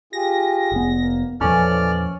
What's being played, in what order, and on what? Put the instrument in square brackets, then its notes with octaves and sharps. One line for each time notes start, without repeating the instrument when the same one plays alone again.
[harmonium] F4 G4 G#4 [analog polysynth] A#6
[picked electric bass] F1 B3 [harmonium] G#4
[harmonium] A#3
[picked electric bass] E2 A#2 F3 [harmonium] E3 A4 [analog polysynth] C#4 [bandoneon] D5 F6